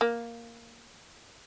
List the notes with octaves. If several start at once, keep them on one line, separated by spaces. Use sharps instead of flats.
A#3